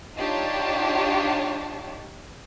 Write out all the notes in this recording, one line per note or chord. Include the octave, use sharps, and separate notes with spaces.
D4 D#4 F4 G4 C#5 A5